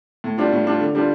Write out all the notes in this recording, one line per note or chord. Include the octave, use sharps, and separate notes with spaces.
A2
G3 D4 F4
A2
G3 D4 F4
D3
G3 D4 F4